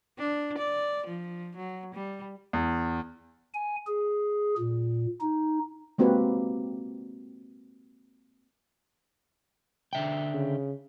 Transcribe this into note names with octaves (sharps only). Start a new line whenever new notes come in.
D4
D5
F3
F#3
G3
E2
G#5
G#4
A#2
D#4
G#3 A#3 C4 F#4 G4 B4
D3 E5 G5
C#3